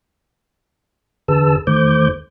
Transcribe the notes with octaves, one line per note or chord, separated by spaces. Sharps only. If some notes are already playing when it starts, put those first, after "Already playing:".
E2 D3 G#4 B4 A5 E6
E2 D#3 A3 C5 D6 G6